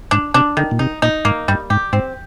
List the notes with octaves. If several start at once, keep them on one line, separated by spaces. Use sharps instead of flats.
G#2 D4
C3 D4
D3 D#3
A#2
C3 D#4
A#2 D#4
G#2 A#3
G2 G3
G#2 G4
G#2 C4